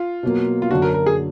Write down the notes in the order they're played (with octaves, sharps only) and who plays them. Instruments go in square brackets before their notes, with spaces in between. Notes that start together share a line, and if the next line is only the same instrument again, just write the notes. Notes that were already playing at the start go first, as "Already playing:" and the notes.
Already playing: [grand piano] F4
[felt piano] B2 F#3 A#3
[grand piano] F4
[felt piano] F#2 D3 F#3 D4 [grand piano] F#4
[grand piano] A#4
A#4
G#4